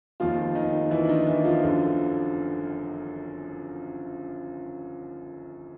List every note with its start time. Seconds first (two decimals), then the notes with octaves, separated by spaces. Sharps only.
0.20 F1 D#2 D#3 F3 F4
0.55 D#3 D#4
0.91 E3 E4
1.05 D4
1.09 D#3 D#4
1.27 E3 E4
1.45 F3 F4
1.63 G1 F#2 D3